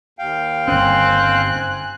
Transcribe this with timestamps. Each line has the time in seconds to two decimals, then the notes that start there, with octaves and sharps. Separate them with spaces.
0.19 D#2 F5 G5
0.68 G1 C4 C#4 G#5 F#6